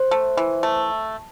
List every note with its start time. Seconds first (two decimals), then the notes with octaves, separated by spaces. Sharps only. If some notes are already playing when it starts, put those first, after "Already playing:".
Already playing: C5
0.11 A3
0.37 E3
0.63 A3